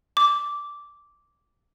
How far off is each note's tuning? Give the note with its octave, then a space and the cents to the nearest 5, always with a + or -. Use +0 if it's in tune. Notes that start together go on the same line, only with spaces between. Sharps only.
D6 -10